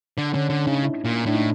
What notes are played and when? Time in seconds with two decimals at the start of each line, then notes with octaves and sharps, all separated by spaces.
0.18 D3
0.33 D3 C#4
0.50 D3 D4
0.67 C#3 D#4
0.83 E4
1.05 A#2
1.26 A2 D4
1.34 D#4